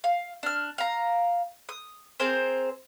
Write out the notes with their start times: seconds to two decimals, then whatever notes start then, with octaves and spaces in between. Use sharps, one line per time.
0.04 F5
0.43 D4 F6
0.78 F5 A#5
1.69 D#6
2.20 C4 G#4 A#4 C5